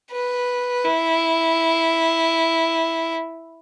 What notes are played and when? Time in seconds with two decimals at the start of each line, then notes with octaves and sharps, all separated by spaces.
0.11 B4
0.84 E4